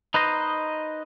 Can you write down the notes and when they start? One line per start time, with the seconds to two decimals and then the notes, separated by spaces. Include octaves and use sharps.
0.14 D#4 B4 C5 D#5